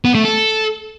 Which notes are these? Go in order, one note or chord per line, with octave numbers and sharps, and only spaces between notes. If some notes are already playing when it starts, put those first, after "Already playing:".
B3
A3
A4